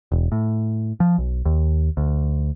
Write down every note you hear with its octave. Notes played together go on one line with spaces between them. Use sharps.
E1
A2
F3
B1
D#2
D2